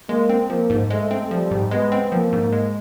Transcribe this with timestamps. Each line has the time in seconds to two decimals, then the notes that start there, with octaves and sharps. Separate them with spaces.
0.09 G#3 A#3
0.29 C4
0.49 F3 A#3
0.70 G#2
0.90 G#3 A3
1.11 C4
1.31 F3 G3
1.51 G#2
1.71 G#3 B3
1.92 C4
2.12 F3 A#3
2.32 G#2
2.53 G#3